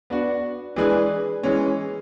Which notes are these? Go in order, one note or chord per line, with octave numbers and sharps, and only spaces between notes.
B3 D4 F#4
E3 G#3 D4 G#4 B4
E3 G#3 C#4